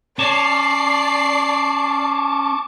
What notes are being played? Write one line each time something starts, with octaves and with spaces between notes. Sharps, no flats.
C#4 D5 A5 C#6 D6 C7